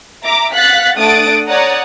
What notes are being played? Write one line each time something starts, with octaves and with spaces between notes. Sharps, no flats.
E5 A#5 D6
F5 F#5 F#6 A6 B6
A3 D4 F#5 D#6 A6 D7
C#5 D5 F#5 A#5 D#6